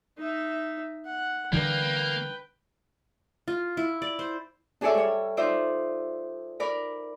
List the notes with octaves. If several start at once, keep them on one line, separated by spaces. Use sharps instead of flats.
D#4 E5
F#5
D3 E3 G3 A#3 B4 G5
F4
E4
D5
C5
D4 G#4 A4 C#5 D5 E5
G3 C#5
D#4 F4 C5 D5 E5
A#4 D5 A#5 B5